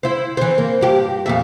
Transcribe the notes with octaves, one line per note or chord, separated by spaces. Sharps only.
E4 C5
E3 C4
A#3
G2 G4
F2 A#2 E5